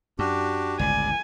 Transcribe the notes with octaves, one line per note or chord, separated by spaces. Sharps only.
F#2 D4 F#4 G4
G1 C#2 A2 G3 D5 G#5